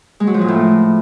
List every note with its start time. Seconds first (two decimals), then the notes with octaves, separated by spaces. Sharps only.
0.20 G#3
0.27 F#3
0.34 F3
0.41 A#2
0.48 A2